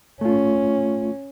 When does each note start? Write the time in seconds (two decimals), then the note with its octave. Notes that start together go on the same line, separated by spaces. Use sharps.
0.21 A3 C#4 F4